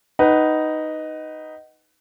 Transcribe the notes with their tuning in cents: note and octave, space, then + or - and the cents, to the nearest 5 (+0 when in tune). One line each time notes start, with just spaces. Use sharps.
D#4 +0 B4 +0 F#5 +25